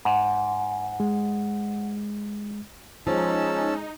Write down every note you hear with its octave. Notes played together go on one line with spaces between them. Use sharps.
G#2 F#5
G#3
F3 G#3 C#4 D#4 A5 E6